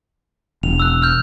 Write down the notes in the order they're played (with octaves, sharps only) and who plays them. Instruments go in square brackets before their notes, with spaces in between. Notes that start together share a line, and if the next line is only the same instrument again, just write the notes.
[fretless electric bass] E1 [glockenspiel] F7
[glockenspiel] E6 F#6
F6 G6